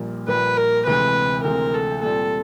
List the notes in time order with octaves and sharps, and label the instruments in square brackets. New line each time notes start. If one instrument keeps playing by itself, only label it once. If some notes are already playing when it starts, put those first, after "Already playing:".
Already playing: [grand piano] A#1 A#2 G3 A#3
[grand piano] A#1 A#2 G3 A#3 [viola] B4
[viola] A#4
[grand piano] D2 C3 E3 G#3 C4 [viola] B4
[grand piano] D2 C3 E3 G#3 C4 [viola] A#4
[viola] A4
[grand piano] A#2 G3 C4 [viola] A4